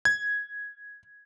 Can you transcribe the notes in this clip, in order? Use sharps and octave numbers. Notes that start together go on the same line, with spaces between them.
G#6